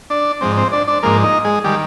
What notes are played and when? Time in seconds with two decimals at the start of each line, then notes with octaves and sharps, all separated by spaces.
0.10 D4 D5
0.41 G#2 F3 G#3 C4 C5
0.57 C4 C5
0.72 D4 D5
0.88 D4 D5
1.03 G#2 F3 G#3 A#3 A#4
1.24 D#4 D#5
1.45 G#3 G#4
1.64 D#3 G3 G#3 G4